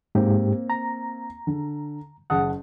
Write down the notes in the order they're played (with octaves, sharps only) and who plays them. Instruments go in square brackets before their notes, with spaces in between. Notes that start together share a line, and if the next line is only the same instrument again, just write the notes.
[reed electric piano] G#2 G4 [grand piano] A#3 C4
[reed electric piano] A#5
[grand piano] D3
[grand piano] F#1 A5 D#6 [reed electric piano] F#5